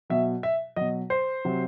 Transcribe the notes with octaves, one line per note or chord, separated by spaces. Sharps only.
B2 F#3 E5
E5
B2 F#3 D#5
C5
C3 F#3